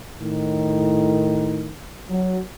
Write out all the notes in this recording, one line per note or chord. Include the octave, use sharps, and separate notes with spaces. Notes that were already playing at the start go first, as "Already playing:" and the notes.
A2 D#3
F#3